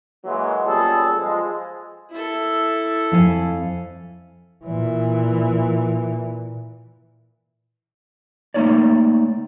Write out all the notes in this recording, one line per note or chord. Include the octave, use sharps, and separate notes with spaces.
E3 F#3 G#3 A#3
F#2 A#2 G3 B3 G#4 A4
F3 G#3
E4 A4
F2 F5 G#5
A#2 E3
A3 A#3 C#4 D#4 C#5 D5